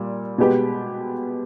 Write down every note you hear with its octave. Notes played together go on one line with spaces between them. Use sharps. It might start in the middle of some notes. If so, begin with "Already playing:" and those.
Already playing: A#2 G3
B2 G#3 B3 G4 B4